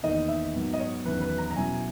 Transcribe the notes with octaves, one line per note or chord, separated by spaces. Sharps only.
E2 D#3 A#3 D#4 D#5
E5
G#2 F#3 B3
D#5
C#5
E2 D#3 F#3 C#4 E4 B4
B4
A#5
A#5
B2 F#3 C#4 E4 G#5